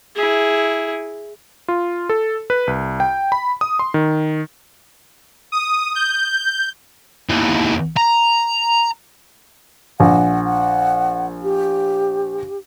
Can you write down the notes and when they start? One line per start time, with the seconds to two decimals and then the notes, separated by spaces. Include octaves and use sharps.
0.16 E4 G#4
1.68 F4
2.09 A4
2.50 B4
2.67 C2
3.00 G5
3.32 B5
3.61 D#6
3.79 C6
3.94 D#3
5.52 D#6
5.95 G6
7.30 D#2 E3
7.97 A#5
10.00 A#1 F#5
10.45 F#5
11.43 G4